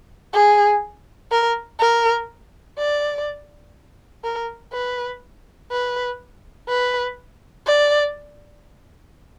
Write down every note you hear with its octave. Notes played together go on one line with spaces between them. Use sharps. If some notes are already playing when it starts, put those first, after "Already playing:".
G#4
A#4
A#4
D5
A#4
B4
B4
B4
D5